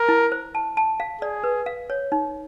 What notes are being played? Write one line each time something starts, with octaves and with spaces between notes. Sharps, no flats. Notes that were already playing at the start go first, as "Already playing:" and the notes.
Already playing: A#4
E4
C5
A5
A5
F5
G#4 D5
B4
F5
C#5
D#4